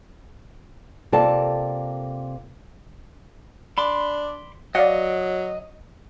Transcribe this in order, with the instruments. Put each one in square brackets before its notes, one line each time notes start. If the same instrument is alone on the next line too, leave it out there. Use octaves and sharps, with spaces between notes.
[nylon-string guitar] C3 A#3 F4 A4 D5 A5
[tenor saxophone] D4 [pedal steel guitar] B5 C6 D6
[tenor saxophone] F#3 [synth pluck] D5 F5 F#5 [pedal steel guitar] D#5